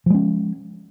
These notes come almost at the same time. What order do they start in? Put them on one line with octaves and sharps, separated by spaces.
F3 G#3 C#4